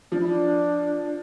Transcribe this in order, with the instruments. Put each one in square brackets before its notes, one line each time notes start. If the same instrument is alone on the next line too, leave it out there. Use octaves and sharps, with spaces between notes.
[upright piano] F3 [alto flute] D4
[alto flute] E4
D4